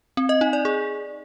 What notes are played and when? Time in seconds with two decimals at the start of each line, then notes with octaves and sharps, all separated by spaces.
0.17 C4
0.29 D#5
0.41 D#4
0.53 D5
0.65 G#4